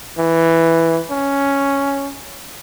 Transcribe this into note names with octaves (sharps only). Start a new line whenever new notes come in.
E3
C#4